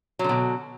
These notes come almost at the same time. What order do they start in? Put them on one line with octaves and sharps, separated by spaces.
F#3 D3 B2